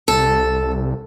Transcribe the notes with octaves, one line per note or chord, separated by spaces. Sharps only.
C2 A4